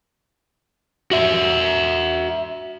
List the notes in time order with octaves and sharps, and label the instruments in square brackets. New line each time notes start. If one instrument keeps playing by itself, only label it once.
[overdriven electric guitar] F#4 E5